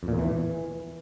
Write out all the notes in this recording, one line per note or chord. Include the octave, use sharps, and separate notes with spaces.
F2
A#2
E2
E3